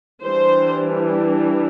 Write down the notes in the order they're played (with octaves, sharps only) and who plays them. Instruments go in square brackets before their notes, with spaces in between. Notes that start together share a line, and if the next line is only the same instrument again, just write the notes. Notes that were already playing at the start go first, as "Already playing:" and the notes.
[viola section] E3 G3 D4 C5